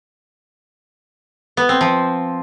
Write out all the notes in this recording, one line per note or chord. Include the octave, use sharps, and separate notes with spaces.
B3
C4
F3